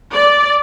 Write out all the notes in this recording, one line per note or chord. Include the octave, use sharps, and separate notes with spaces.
D5